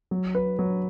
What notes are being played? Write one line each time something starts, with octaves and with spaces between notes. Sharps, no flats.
F#3
B4
F#3